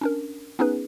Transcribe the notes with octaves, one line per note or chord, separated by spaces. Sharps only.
C#4 D4 A#4
B3 C#4 D#4 G#4 B4